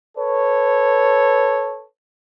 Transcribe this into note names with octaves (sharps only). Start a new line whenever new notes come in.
A4 B4 C#5